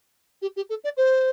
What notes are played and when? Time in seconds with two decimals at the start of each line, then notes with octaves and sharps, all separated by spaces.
0.42 G4
0.56 G4
0.70 A4
0.84 D5
0.97 C5